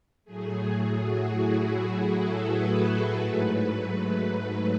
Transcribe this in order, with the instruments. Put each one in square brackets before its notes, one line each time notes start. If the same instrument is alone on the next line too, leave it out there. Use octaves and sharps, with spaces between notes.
[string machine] A2 F#3 A3 G#4
F#4
E4
A4
B4
G#2 F#3 A3